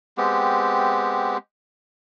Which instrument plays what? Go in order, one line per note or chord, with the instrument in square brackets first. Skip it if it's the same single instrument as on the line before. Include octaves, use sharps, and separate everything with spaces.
[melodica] G#3 B3 C4 G4